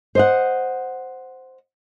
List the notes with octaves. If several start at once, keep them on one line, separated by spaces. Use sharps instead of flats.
C5 D#5 F#5